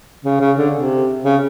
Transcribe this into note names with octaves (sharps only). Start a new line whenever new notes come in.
C#3
C#3
D3
C3
C#3